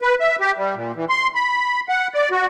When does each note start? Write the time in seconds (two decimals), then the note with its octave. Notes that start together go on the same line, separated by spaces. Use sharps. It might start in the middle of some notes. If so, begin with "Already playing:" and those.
0.02 B4
0.20 E5
0.40 G4
0.57 G3
0.75 A#2
0.95 E3
1.09 C6
1.35 B5
1.89 F#5
2.14 D5
2.31 F#4